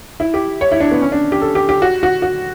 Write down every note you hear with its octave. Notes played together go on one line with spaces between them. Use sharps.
E4
G4
C#5
E4
D4
B3
C#4
D4
G4
A4
G4
G4
F#4
F#4
F#4